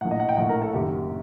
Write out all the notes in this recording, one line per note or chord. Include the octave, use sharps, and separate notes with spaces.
A#1 A2 F#5
D#5
F#5
G5
A#1 A2 F#5
A#4
A4
F#1 F#2 D#3 G4